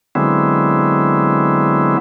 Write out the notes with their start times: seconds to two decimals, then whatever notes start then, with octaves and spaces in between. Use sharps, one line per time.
0.15 D3 F#3 G#3 B3 C4 E4